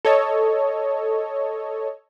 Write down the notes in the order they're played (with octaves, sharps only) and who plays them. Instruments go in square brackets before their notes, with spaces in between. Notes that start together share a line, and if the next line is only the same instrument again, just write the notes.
[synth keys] A4 C#5 D#5